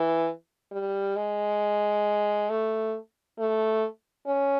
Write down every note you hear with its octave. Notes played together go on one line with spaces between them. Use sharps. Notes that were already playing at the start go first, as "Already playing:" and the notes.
Already playing: E3
G3
G#3
A3
A3
C#4